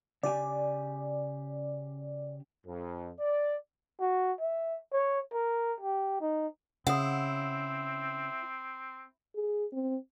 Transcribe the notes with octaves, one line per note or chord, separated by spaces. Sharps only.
C#3 G4 D5 G#5
F2
D5
F#4
E5
C#5
A#4
G4
D#4
C#3 C4 E4 F#5 D#6
G#4
C4